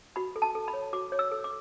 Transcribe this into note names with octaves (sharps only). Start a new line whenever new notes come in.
F#4 B5
A4
A5
A4
B5
C#5
F#4 D6
C#5
E6
A4
D6